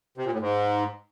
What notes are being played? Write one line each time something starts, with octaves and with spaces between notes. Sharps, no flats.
C3
A#2
A2
G#2